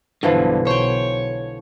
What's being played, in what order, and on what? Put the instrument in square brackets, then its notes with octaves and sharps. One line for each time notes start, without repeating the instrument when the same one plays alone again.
[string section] B1 [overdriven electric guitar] G2 [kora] D3 E3 F3
[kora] C5 G5 [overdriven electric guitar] C#5